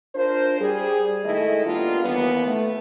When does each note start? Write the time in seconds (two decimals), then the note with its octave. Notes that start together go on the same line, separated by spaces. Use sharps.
0.15 D4 F4 A#4 C5
0.60 G3 G#4
1.25 D#3 G#3 A3 E4 A4 D#5
1.66 G3 A#3 B3 D4 F4
2.04 D#2 E3 A#3 B3
2.47 A3